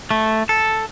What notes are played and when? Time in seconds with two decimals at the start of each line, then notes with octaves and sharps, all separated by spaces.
0.11 A3
0.49 A4